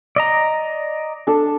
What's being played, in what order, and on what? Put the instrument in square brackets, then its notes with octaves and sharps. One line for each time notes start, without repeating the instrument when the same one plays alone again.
[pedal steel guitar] D5 D#5 A#5
[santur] D4 A4